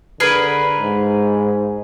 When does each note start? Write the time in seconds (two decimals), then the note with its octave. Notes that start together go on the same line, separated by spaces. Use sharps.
0.20 D3 G#4 A#4 B4
0.79 G#2